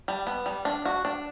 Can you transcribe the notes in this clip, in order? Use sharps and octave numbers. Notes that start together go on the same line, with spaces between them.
G3
B3
G3
D4
F#4
D4